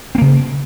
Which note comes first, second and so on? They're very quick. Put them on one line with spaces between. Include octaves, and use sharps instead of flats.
C4 A#3 C#3